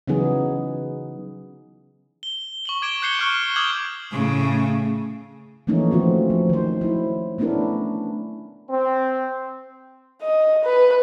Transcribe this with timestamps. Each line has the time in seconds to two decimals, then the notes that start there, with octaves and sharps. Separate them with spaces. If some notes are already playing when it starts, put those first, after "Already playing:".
0.08 C#3 E3 F#3 B3 D#4 G#4
2.23 G7
2.65 C#6 F#7 G7
2.82 D6 G#6 D7 E7 G7
3.02 F#6 G6 C7 C#7 G7
3.19 C#6 F6 F#6 G7
3.56 D6 D#6 F6 G6 G#6 F#7
4.12 A2 C#3
5.67 E3 F3 A3 A#3 C#4 D#4
5.91 D#3 F3 A3 C4 F4 F#4
6.30 F3
6.49 D#3 C5
6.81 F#3 E4
7.38 A3 B3 C#4 D4 E4 A#4
8.70 C4
10.22 D#5
10.65 B4